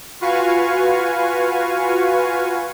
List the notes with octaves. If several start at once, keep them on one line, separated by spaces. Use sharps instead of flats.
F4 F#4 B4 F5 G#5 C#6